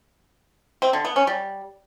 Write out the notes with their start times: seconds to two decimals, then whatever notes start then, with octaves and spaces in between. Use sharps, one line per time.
0.82 C4
0.93 D3
1.05 B3
1.16 C#4
1.27 G3